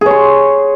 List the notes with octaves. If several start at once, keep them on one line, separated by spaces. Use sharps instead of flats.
G#4 C#5 C6